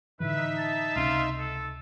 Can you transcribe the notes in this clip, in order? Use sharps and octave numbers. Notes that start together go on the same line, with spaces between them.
A2 D3 E3 D#4 B4 E5
A5
C#2 C3 C#4 F4
A4